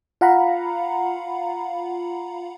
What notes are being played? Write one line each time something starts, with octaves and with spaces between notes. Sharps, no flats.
F4 F5 F#5 A#5 B5